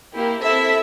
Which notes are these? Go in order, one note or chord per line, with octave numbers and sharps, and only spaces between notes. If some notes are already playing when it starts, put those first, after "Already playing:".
A#3 E4 G4
C4 E4 A4 E5